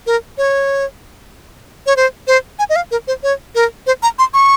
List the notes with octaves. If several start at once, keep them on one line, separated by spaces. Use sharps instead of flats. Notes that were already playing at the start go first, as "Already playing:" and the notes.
A#4
C#5
C#5
C5
C5
G#5
D#5
F5
A#4
C5
C#5
A#4
C5
A#5
C6
C#6